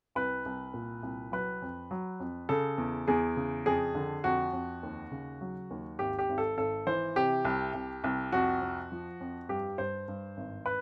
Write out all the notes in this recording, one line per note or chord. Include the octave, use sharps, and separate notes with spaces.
C2 B4
C2
A#2
C2
F#3 B4
F2
F#3
F2
C#3 A4
E2
E2 G#4
C#3
F2 G#4
D3
F2 F#4
F2
D#2
C#3
F#3
D#2
G#1 G4
G4
G#1
A4
G#1 A4
E3 C5
C3 G4
C2
C2
C2
F2 F#4
F2
F3
F2
G2 G4
G2 C5
G2
G#1
B4